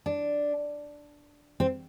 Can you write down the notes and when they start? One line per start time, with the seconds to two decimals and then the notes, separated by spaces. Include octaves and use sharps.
0.06 D4
1.60 C4